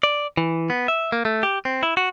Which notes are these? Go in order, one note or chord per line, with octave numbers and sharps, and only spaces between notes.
D5
E3
B3
E5
A#3
A3
G4
C4
E4
F#4